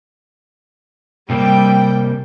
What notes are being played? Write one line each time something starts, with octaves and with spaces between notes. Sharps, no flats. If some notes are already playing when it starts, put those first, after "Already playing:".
C3 G3 A#3 C4 G5